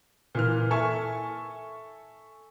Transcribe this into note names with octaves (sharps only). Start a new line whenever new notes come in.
A#2 E3 F6
A4 E5 G#5 C#6